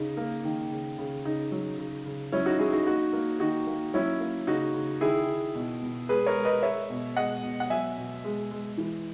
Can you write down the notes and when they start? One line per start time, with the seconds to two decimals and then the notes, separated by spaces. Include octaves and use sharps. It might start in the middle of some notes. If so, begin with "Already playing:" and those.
Already playing: C#3 D#4
0.17 A#3
0.44 D#3
0.71 C#3
0.98 C#3
1.25 C#3 D#4
1.51 F#3
1.78 C#3
2.06 C#3
2.32 F#3 C#4 E4
2.46 D#4 F#4
2.59 F#3 E4 G#4
2.72 D#4 F#4
2.86 A#3 D#4 F#4
3.13 A#3
3.40 D#3 D#4 F#4
3.67 A#3
3.94 F#3 C#4 E4
4.20 A#3
4.47 C#3 D#4 F#4
4.74 C#3
5.01 D#3 E4 G#4
5.28 D#3
5.55 B2
5.82 B2
6.09 G#3 G#4 B4
6.26 A#4 C#5
6.35 G#3
6.45 B4 D#5
6.63 G#3 C#5 E5
6.90 B2
7.16 G#3 D#5 F#5
7.43 B2
7.60 F#5
7.70 F#3 E5 G#5
7.98 B2
8.24 G#3
8.51 G#3
8.78 E3